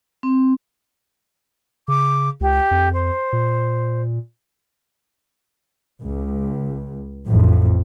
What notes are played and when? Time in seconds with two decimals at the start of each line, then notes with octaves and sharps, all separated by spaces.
0.23 C4
1.88 C#3 D6
2.41 C#2 G4
2.71 F2
2.93 C5
3.33 A#2
6.02 C#2
7.26 A1 F2 A2